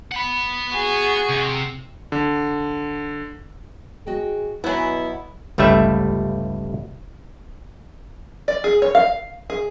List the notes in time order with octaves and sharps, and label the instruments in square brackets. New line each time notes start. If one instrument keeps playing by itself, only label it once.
[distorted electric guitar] F#5 B5
[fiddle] F#4 G#4
[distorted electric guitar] C3
[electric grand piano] D3
[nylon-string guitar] F#4 D#5 G5 [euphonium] G#4
[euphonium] B2 [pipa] F#3 B3 [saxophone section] E4 [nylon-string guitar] B4 G#5
[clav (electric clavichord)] G1 C#2 G3 A3 B4 E5
[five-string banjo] D5
G#4
C#5
F5
G#4